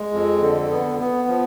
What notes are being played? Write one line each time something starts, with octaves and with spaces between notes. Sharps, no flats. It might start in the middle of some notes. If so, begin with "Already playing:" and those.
Already playing: G#3
F2
D3
B3
B3
F3